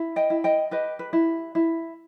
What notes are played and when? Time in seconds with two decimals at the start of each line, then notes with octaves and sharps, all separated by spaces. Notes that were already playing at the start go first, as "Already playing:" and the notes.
Already playing: E4
0.16 D#5 G5
0.30 E4
0.44 D#5 G5
0.71 G4 B4 D#5
0.99 B4
1.13 E4
1.55 E4